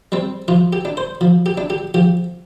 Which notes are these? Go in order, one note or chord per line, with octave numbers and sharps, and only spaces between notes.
G3 C4
F3 F4
G4
D4
C5
F3
G4
D4
G4
F3 G4